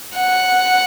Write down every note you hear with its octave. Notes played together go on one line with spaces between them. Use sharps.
F#5